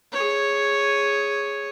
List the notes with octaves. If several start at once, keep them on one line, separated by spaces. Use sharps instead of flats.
G#4 C#5